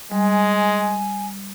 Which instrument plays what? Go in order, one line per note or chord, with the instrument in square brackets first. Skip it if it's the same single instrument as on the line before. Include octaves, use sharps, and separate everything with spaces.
[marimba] G3 [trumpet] G#3 [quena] G#5